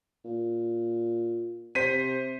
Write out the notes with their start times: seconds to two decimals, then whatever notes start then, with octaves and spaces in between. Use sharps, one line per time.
0.25 A#2
1.75 C3 C5 B6 D#7